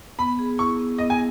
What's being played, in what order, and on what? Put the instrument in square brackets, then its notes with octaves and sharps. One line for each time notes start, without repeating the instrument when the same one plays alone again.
[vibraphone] B3 [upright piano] B5
[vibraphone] G#4
[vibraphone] E4 [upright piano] C#6
[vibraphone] B3
[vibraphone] B3 [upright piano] D#5
[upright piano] G#5